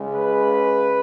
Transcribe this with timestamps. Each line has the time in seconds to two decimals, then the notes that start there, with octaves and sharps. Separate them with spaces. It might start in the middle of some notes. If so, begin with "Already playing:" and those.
Already playing: C#2 C#3 G#3
0.14 B4